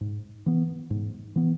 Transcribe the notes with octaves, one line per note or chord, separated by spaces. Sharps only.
G#2
E3 B3
G#2
E3 B3